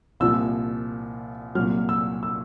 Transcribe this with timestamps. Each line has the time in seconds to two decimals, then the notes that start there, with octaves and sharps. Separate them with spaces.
0.20 C2 A#2 F3 E6
1.55 C2 A#2 F#3 F6
1.89 E6
2.23 E6